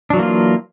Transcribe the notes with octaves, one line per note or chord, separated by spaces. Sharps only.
E3 F#3 A#3 D4 F4